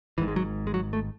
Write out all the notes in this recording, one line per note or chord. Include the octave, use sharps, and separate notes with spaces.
G#1 G#2 E3
G#3
F#3
G#3
F#3
A3